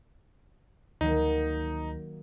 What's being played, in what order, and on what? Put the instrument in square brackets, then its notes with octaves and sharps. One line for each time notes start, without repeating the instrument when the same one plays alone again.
[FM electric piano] D2 [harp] D#3 F#3 A#3 [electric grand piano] D#4